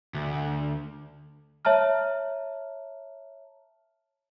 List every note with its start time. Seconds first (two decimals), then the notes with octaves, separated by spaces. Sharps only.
0.14 D2
1.65 C#5 E5 A5 A#5 F6